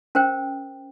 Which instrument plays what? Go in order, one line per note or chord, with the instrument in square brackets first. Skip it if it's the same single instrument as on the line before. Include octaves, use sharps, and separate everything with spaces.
[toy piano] C#4 A#4 C5 G5